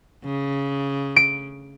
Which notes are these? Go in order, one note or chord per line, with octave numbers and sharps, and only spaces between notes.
C#3
D7